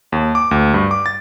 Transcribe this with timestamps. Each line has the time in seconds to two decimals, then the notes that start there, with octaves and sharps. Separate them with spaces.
0.12 D#2
0.35 D6
0.51 D2
0.74 G2
0.91 D6
1.06 A6